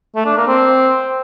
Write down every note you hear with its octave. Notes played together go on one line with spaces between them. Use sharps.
A3
D4
A#3
C4